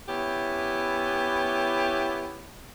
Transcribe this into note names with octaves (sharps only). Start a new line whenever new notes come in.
B3 C#4 E4 G4